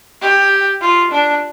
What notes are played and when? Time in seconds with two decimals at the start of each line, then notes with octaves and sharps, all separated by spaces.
0.22 G4
0.81 F4
1.11 D4